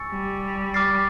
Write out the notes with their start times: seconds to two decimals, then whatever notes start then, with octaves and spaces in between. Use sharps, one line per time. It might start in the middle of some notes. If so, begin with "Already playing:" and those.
Already playing: G#5 C#6 E6 A6 C#7
0.11 G3
0.74 D6 F6 A6 C7